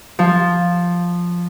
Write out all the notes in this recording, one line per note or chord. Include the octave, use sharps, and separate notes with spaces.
F3